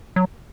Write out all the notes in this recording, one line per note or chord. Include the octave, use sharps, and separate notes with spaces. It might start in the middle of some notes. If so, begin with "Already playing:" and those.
F#3